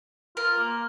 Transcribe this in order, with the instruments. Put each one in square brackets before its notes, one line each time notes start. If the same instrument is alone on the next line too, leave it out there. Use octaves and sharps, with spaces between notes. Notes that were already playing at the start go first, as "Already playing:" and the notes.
[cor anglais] F4 [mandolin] A#4
[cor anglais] A#3